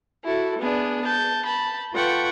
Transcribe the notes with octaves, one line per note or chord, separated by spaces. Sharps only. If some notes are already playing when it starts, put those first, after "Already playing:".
E4 F#4 A4
B3 D4 G#4
A5 G6
A5 B5
F4 A4 B4 F#5 G5 C#6